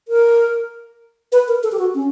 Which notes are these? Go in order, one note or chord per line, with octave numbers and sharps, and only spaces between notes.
A#4
B4
A#4
A4
G4
F#4
C#4